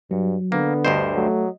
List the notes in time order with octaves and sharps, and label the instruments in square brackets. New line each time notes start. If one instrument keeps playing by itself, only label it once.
[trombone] G2 [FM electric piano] F#3
[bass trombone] D3 [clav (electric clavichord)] A#3 [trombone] B3
[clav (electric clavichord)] D2 G2 C5 [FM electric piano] D#5
[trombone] F#3 [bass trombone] A3